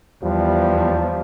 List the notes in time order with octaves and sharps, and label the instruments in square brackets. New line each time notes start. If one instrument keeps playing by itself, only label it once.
[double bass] E2 [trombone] F3 [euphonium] G3